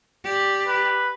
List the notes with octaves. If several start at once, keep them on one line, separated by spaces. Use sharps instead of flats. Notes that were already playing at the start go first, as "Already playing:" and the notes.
G4 D5
B4